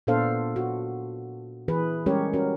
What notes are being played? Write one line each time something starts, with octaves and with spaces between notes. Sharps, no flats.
A#2 B3 D4 A4 C5 F5
F#4
E3 G#4 B4
G3 G#3 C#4 G4 A#4 C#5
C#4 F#4 A#4